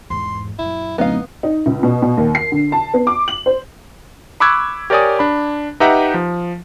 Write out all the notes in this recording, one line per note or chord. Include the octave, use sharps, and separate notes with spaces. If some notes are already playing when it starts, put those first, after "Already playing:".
E2 G#2 C6
F#2 A#2 E4
D1 B3 D#4 F5
D#4
C#2
B2
B2
D#2
C7
D3
A5
B3
D6
F#7
C5
B5 C#6 D6 E6 F#6 G#6
G4 A#4 C#5 D5 G#5 D#6
D4 B5
D#4 G4 B4 E5 F#5 A#5
F3